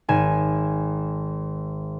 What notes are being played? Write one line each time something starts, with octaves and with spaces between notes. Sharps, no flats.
G#1 G#5 G#6 E7